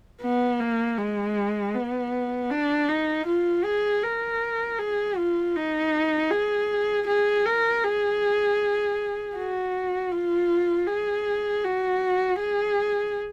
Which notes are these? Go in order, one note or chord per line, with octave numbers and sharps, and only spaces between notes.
B3
A#3
G#3
B3
D4
D#4
F4
G#4
A#4
G#4
F4
D#4
G#4
G#4
A#4
G#4
F#4
F4
G#4
F#4
G#4